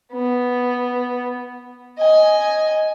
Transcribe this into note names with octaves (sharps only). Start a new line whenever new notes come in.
B3
D#5 G#5